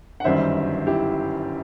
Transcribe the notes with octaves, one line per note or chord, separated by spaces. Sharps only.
F#5
G1 F#2 D#3 G3 C5 E5
E4 G4